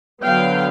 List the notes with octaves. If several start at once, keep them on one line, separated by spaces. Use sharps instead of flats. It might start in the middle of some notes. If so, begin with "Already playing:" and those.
D3 F#3 B3 F5 G5